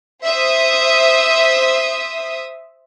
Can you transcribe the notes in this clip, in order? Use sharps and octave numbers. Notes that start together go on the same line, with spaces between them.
C5 E5 D#6